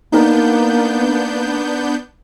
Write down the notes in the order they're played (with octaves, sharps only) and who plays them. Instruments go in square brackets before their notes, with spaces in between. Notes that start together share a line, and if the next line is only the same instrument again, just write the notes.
[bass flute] A#3 [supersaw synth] B3 D4 G6 [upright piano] D#4 A#4